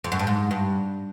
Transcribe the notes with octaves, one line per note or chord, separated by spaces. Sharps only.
F2
F#2
G2
G#2
G2